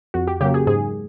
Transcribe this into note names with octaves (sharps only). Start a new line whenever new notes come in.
F2 F#4
G4
C#3 F#3 A#3 G4
G#4
G#2 G#4